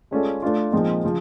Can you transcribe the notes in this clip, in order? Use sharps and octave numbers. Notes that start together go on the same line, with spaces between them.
G#3 C#4 F4 A4 D5
A3 D4 F4
A#2 F3 G#3 C4 D#4
C#3 F3